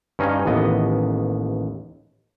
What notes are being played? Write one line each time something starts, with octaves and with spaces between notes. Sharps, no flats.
G2 C#4 D#4 D#5 F5 G#5
A1 D#2 B3 D#5